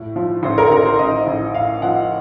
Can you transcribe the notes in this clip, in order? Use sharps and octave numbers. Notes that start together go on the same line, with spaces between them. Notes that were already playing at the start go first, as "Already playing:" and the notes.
Already playing: A2
F3
A1 C5
A#4
A1 A#4
C5
A1 D#5
A1
A2 F5
F3 F#5